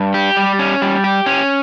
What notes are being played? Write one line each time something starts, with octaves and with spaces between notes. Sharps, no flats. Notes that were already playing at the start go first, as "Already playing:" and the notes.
Already playing: G2
G4
G3
C#4
G3
G4
C#4